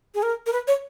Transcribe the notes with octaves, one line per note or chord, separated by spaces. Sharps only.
G#4
A#4
A#4
B4
C#5